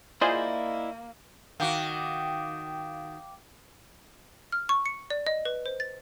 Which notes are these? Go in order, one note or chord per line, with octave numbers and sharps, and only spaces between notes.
A#3 E4 F4 G#4 C5 D5 D#5
D#3 F#4 F5 G5 D6
F6
C#6
C#7
D5
D#5
B4
C5
A6